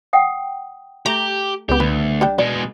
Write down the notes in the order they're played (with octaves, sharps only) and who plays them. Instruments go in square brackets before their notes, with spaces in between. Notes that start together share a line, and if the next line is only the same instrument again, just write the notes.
[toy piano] F#5 G5 D#6
[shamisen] A3 [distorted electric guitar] G4 [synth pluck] A#5
[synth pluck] C#2 B3 [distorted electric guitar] G4
[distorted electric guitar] D2 [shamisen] B4
[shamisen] G3 D4 G5
[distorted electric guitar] B2 G#3 [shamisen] D5